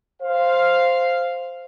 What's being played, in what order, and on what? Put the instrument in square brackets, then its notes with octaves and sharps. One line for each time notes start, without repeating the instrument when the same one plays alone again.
[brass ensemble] C5 F5